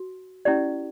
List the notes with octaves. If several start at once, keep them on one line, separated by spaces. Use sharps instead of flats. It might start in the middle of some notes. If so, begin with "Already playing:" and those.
Already playing: F#4
C#4 E4 G4 D5